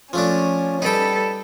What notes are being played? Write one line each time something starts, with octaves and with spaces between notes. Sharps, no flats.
F3 A3 C#4 D4
G3 D#4 A4 B4 G5